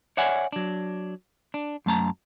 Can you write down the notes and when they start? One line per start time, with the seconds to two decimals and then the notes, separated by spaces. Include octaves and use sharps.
0.17 C#5 D5 E5 F#5 G#5
0.52 F#3 D4
1.54 D4
1.86 F#2 A3 A5 A#5